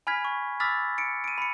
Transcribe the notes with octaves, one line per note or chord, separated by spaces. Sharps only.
G#5 B5 F6 G#6 B6
C#6
B5 D6 E6 F6 A6 B6
C#7 D7
D7 D#7
B5 C#7